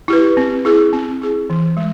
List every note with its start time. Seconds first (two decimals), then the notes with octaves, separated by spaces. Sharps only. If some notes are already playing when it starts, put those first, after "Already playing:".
0.08 E4 G4 B4
0.37 C4
0.65 E4 G#4
0.93 C4
1.21 E4 G#4
1.50 E3
1.77 G#3